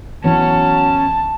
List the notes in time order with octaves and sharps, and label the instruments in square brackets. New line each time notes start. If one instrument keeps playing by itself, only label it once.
[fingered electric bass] E3 B3 [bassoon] F#3 [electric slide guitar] C#4 C#5 [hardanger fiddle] A5